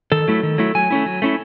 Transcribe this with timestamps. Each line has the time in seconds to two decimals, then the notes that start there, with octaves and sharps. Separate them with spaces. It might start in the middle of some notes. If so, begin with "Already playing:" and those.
0.12 D#3 A4
0.28 F#3 A3 E4
0.43 D#3
0.58 F#3 A3 E4
0.75 F#3 G#5
0.91 A3 C#4 E4
1.06 F#3
1.22 A3 C#4 E4